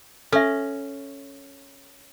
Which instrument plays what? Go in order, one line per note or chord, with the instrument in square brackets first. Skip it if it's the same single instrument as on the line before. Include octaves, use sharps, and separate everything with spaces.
[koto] C#4 [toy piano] A4 E5